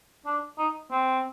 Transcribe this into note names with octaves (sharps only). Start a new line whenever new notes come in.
D4
D#4
C4